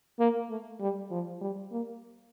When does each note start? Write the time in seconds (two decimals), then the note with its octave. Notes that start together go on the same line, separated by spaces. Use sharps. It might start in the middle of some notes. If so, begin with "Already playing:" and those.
0.19 A#3
0.50 A3
0.80 G3
1.11 F3
1.41 G3
1.72 A#3